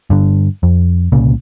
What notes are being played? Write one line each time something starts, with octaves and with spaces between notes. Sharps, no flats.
G2 D3
F2
C2 A#2 C#3